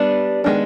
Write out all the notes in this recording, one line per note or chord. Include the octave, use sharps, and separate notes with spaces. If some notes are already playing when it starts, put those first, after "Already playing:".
Already playing: G3 B3 D4
D#3 G#3 B3 D4